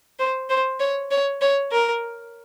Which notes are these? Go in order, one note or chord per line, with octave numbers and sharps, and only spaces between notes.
C5
C5
C#5
C#5
C#5
A#4